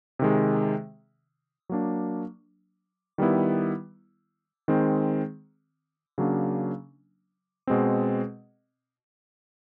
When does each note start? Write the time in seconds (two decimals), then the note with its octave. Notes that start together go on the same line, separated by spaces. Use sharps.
0.19 C3 D#3 G#3
1.69 F#3 A#3 D4
3.18 D#3 G3 B3 E4
4.68 D#3 G#3 C4
6.18 C#3 F#3 A#3 D4
7.67 B2 G#3 C4